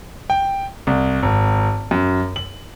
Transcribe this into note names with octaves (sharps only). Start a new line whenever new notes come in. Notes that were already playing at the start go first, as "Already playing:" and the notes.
G5
C2
G#1
F#2
F#7